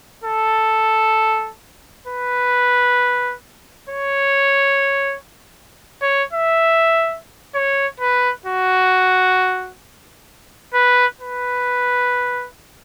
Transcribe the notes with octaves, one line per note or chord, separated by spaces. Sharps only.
A4
B4
C#5
C#5
E5
C#5
B4
F#4
B4
B4